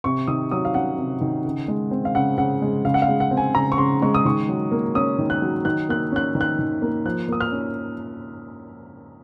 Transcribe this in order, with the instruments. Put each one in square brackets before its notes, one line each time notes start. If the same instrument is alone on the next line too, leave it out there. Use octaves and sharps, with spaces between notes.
[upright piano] C3 C#6
D#3 D#6
F#3 D#6
F5
C#4 F#5
C3
D#3
C#3
G#3
C4
F5
C#3 F#5
C#3 F#5
G#3
C#3 F5
F#5
F5
G#3
F#5
C4
G#5
C#3 A#5
C#6
C#3 C6
G#3 C#6
D#6
D#3 C#6
F#3
A#3
C#4 D#6
D#3
F#6
F#3
D#3 F#6
A#3 F#6
C#4 F#6
D#3
F#6
D#3
A#3
F3 F#6
A#3 D#6
F6
C#4